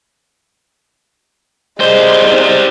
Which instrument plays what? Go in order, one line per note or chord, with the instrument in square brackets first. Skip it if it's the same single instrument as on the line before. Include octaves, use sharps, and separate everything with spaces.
[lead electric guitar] G3 C5 [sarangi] G#3